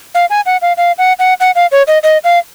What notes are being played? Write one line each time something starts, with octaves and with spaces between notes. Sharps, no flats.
F5
G#5
F#5
F5
F5
F#5
F#5
F#5
F5
C#5
D#5
D#5
F5